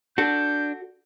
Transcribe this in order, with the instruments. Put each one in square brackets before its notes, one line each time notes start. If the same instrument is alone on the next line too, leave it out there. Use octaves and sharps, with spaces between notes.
[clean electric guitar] D4 [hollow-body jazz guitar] F#4 A4 [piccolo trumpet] G6